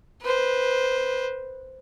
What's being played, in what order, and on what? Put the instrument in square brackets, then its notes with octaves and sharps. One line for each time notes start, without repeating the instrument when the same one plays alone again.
[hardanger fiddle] B4 C5